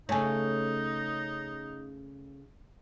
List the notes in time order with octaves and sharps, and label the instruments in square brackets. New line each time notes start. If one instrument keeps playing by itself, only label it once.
[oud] C#3 A3 [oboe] D#4 [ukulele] C#5 G#5